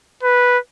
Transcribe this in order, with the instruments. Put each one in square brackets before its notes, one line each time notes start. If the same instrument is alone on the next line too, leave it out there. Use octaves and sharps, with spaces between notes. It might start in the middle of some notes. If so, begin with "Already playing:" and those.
[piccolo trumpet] B4